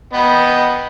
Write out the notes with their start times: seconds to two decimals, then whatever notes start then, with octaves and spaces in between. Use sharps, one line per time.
0.13 B3 D#5 G5